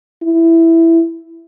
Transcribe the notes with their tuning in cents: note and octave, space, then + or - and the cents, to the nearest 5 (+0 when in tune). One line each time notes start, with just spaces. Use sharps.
E4 +5